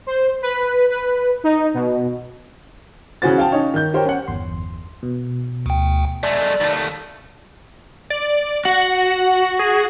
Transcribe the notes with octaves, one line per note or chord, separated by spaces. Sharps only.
C5
B4
B4
D#4
B2
C#3 E3 F#4 C5 A6
F5 G5 A5
C#4 D#4 C#5
D#3 G6
G4 A#4 C5 C#5 G5
C#4 F#5
G1 E2 C6
B2
D2 G5
G#3 A3 D5
D#2 A3
D5
F#4 F#5
G#4